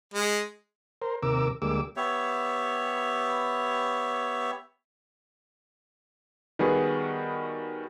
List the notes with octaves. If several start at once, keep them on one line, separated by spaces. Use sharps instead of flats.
G#3
A#4 C5
D#2 C3 A#4 D6 E6
D2 G3 G#3 A#3 D6 E6
B3 G4 C#5 E5
D#3 G3 B3 F#4 G#4 B4